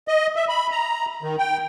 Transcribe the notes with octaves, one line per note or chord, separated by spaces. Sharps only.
D#5
E5
B5
A#5
D#3
G5